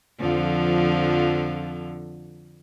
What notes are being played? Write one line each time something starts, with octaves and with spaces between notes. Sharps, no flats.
F2 D3 F3